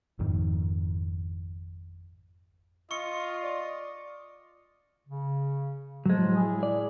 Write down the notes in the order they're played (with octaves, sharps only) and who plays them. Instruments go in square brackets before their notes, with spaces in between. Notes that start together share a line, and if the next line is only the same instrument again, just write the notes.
[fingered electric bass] G#1 F2 D#3
[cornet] F4 [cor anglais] D#5 [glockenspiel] C#6 C#7
[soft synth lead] D5
[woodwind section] C#3
[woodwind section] A2 F3 [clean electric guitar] F#3 G#3
[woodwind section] A2 E4 G#4
[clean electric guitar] D5